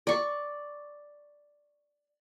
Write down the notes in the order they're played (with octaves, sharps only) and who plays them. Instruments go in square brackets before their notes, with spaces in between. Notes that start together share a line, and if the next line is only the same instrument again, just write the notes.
[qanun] D5 C#6